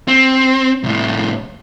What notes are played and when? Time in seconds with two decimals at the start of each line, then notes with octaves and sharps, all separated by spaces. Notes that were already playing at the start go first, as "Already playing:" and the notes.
0.08 C4
0.84 C2 A2